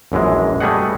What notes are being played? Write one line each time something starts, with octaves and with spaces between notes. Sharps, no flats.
A#1 F#2 E3 G#3
G3 A3 B3 G#4 D#5 F#5